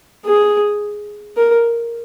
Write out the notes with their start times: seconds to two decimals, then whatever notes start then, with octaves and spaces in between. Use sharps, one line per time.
0.25 G#4
1.36 A#4